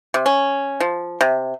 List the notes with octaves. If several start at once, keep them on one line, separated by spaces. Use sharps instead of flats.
C3
C#4
F3
C3